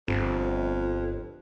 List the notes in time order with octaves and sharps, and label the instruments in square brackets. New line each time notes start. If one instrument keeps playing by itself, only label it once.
[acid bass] G1 [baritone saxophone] F2